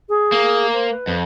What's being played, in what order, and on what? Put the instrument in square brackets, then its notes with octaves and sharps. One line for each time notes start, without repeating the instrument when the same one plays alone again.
[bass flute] G#4
[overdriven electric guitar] A#3
[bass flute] C5
B4
[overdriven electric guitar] F2